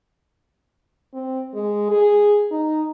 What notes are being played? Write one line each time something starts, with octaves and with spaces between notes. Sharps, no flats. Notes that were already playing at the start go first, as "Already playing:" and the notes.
C4
G#3
G#4
D#4